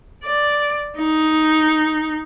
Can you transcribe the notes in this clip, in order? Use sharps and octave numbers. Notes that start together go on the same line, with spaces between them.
D5
D#4